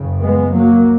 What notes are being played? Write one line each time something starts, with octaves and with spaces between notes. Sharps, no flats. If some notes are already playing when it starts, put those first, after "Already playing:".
Already playing: F#1 F#2 C#3
G#3 B3
F#3 A#3